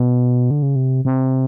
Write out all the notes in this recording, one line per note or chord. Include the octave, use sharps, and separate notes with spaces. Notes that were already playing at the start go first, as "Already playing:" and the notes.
Already playing: B2
D3
C#3
C3
C3